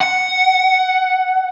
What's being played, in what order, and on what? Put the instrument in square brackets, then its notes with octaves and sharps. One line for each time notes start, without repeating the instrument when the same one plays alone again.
[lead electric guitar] F#5